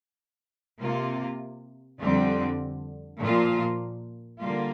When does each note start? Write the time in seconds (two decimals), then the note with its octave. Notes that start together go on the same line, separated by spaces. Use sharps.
0.81 C3 A#3 F4
2.01 F2 D3 G3 C4
3.20 A#2 F3 A#3 F4
4.39 D3 G3 A#3 F4